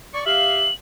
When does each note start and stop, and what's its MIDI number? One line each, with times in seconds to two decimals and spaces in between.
0.14 0.25 74
0.14 0.25 85
0.26 0.68 67
0.26 0.68 76
0.26 0.68 77
0.26 0.74 102